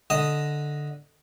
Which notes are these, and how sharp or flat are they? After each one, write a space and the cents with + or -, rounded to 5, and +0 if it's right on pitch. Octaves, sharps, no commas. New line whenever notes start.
D3 +0 D#5 +0 D#6 +0